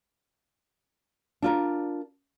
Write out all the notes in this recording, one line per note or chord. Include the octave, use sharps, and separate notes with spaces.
D4 F4 A#4